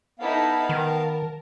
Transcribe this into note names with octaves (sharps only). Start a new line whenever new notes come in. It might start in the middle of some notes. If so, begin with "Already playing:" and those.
B3 D#4 E4 A4 F5
D#3 A#4 A5